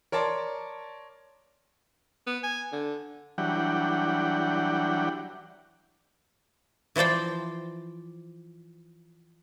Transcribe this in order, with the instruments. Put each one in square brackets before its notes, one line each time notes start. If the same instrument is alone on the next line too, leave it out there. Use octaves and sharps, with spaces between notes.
[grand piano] A#4 C#5 D5 A5 C6
[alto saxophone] B3
G#5
D3
[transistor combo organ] E3 F#3 G3 D4 F#5 G5
[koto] E3 F3 C5 D5 G5